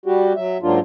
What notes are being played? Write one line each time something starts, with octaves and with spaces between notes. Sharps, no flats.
G3 F#4 G4
F#3 E5
G#2 F#3 A#3 D4 F4